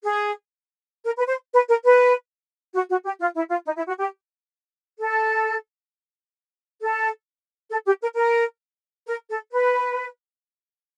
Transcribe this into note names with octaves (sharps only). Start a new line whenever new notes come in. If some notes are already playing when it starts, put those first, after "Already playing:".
G#4
A#4
B4
C5
B4
A#4
B4
F#4
F#4
G4
F4
E4
F4
D#4
E4
F#4
G4
A4
A4
A4
G4
A#4
A#4
A#4
A4
B4